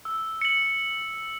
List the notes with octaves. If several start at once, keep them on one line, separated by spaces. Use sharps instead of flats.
E6
C#7 F#7